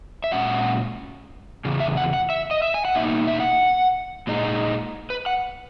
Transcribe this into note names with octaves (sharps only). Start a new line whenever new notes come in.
E5
A#2 G#3 C#4 F#5
E2 C#3
E5
F#5
F#5
E5
D#5
E5
G#5
F#5
B2 A#3 D#4 E5
E5
F#5
A#2 G#3 D#4
B4
F#5